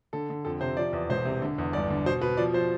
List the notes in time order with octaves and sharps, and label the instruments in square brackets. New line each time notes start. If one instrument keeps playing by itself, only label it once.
[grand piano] D3 A4
D3
F2 A4
C3 C5
F3 D5
E2
E1 C5
C3
D3
E2
G1 D5
D3
B2 C5
B2 B4
F3 D5
F3 C5